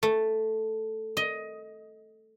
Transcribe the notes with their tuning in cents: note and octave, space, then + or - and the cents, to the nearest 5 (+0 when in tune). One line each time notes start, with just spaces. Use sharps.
A3 +0
D#5 +15